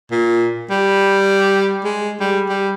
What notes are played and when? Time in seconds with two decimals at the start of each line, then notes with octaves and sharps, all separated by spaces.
0.12 A#2
0.70 G3
1.84 G#3
2.21 G3
2.49 G3